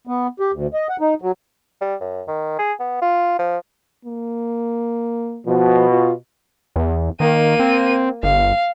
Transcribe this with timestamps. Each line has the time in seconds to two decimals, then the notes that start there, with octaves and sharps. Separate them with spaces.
0.07 B3
0.40 G4
0.52 D2
0.73 D#5
0.89 F#5
1.01 D#4
1.22 F#3
1.81 G3
2.00 F#2
2.28 D#3
2.59 G#4
2.80 B3
3.02 F4
3.39 F3
4.05 A#3
5.46 B2 F3
5.90 F4
6.76 E2
7.20 D#3 A#3 D#7
7.60 C4
8.23 G1 F5